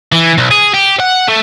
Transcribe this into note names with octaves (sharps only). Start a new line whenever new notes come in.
E3
B1
G#4
G4
F#5
A3